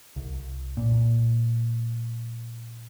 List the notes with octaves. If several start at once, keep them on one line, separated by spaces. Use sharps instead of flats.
C2
A#2